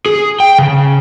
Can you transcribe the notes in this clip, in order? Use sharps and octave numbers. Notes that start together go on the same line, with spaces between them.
G#4
G5
C#3